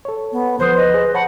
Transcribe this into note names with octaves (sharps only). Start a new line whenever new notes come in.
A4 C#5
B3
D2 F3 B4 C5 D#6
D#5
G#4 C5
C#5 F#5 A5 B5